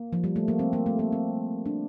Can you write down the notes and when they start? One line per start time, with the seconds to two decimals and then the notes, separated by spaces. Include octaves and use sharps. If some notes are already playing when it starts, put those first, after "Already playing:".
Already playing: A#3
0.13 F3
0.24 G3
0.36 A3
0.48 A#3
0.59 C4
0.73 A#3
0.86 A3
0.99 A#3
1.12 C4
1.66 D4